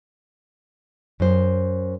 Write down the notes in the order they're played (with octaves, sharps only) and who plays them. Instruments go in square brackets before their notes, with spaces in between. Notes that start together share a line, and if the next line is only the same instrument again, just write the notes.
[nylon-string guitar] F#2 C5